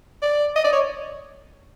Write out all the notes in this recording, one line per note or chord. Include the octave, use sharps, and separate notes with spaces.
D5
D#5
D5
C#5